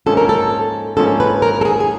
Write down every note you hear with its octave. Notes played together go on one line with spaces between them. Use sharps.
G#2 F3 A#3 C#4 A4
A#4
A4
G#2 F3 A#3 C#4 A4
B4
A#4
A4
G#4
G#4